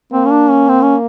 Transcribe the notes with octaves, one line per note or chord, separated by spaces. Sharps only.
A#3 C4
C#4
D4
C#4
C4
C#4